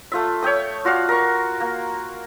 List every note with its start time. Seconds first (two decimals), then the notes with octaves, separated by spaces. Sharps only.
0.12 A3 F4 E5
0.43 C#5 E5 G5 D#6
0.85 F4 F#4 D5 F5
1.09 A#4 C#6
1.60 A#3